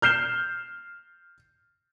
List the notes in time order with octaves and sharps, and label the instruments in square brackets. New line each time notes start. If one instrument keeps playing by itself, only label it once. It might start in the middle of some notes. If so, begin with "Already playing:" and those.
[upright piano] F6 G6 C7 E7 G7